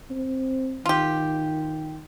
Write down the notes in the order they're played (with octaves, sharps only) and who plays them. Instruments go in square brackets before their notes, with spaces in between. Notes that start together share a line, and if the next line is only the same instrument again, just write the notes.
[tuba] C4
[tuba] D#3 [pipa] F4 G4